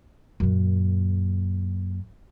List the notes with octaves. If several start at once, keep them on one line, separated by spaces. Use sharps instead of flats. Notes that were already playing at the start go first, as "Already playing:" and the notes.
F#2 A#2